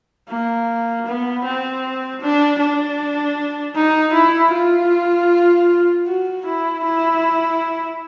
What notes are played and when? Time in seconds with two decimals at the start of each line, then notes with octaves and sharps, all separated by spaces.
0.29 A#3
1.06 B3
1.45 C4
2.21 D4
2.59 D4
3.75 D#4
4.13 E4
4.52 F4
6.07 F#4
6.45 E4
6.84 E4